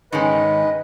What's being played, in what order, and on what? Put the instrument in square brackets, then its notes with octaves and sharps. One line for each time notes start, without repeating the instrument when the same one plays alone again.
[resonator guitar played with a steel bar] G#2 D#3 G#3 C#4 [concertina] B4 D#5